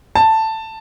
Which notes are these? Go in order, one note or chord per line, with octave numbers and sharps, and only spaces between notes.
A5